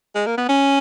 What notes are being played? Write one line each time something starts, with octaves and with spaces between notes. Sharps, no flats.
G#3
A#3
B3
C#4